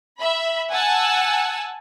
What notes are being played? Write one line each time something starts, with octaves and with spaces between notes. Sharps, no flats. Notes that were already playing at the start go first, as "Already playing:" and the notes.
E5 B5
F#5 G#5 A5 E6